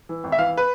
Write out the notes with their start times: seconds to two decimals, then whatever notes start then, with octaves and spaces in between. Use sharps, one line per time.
0.09 E3
0.24 G#1
0.32 E5
0.38 E3 F5
0.57 B4